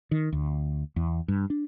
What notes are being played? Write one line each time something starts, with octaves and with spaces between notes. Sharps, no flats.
D#3
D2
E2
G2
D4